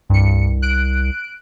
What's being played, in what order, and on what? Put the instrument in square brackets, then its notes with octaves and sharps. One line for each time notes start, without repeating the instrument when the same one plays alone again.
[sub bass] C2 [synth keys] G2 C#7
[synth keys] F#6 D7